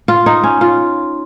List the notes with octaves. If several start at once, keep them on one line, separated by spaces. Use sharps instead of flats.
F4
D#4
C#4
F4